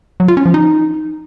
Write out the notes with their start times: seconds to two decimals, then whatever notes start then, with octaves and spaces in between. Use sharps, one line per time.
0.20 F#3
0.28 F4
0.37 C#4
0.45 F3
0.54 D#4